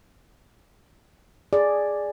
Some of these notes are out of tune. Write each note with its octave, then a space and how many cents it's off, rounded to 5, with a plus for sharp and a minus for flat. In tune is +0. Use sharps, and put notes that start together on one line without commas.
G#4 +0 D5 +0